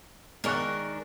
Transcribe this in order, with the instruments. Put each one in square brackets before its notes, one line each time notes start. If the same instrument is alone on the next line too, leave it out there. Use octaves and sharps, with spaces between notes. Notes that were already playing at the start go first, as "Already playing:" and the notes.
[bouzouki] D#3 D4 A#4 [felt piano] G#3 C#6 F#6